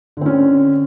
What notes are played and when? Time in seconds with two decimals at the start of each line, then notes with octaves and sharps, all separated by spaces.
0.17 D3
0.21 C4
0.26 C#4